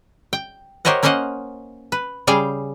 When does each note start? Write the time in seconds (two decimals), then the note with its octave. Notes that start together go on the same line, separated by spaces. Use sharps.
0.33 G5
0.85 G4 A#4 C5 C#5 D#5 F#5
1.03 A#3 C#4 A#4 C5 D#5 F#5
1.92 B4
2.27 C#3 G3 G#4 F5 G5